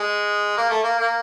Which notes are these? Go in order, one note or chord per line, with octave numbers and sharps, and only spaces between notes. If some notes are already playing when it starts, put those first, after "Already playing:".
Already playing: G#3
A#3
A3
A#3
A#3